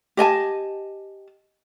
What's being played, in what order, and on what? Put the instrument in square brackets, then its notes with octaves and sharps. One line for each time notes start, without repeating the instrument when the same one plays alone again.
[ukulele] G4 D#5 G#5 A5